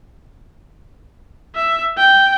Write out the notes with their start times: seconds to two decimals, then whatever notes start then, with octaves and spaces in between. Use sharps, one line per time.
1.55 E5
1.97 G5